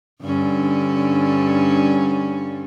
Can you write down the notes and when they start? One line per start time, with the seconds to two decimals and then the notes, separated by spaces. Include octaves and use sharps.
0.21 G2 D3 C#4